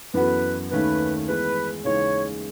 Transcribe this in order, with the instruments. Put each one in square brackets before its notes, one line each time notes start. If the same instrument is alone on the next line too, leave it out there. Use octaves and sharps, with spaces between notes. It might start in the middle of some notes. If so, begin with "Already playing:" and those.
[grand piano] F#2 E3 B3 F#4 A4 [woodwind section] B4
[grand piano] D#2 D#3 A3 C#4 [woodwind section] B4
[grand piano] E3 G#3 B3 [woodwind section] B4
[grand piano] D#2 C#3 E3 G#3 C#4 [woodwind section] C#5